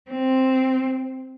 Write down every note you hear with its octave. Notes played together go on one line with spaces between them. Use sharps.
C4